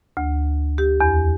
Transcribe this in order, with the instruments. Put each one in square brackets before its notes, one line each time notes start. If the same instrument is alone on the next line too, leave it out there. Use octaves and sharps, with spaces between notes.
[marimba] D2
G4
E2